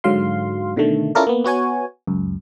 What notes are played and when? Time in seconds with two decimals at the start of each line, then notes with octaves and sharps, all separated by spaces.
0.04 G#2 D3 F#3 F5 C6
0.76 B2 D3 D#3 A3
1.15 C#4 E4 F4 A4 A#4 D5
1.27 A#3 B3
1.44 B3 F#4 C#5 G#5
2.07 C#2 F#2